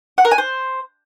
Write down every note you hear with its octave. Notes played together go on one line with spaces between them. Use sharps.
F#5
A#4
G#5
C5